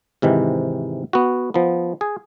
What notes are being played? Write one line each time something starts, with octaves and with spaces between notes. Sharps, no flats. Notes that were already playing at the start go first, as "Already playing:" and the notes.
G#2 C3 D#3 E3
B3 F#4
F3 B3
G#4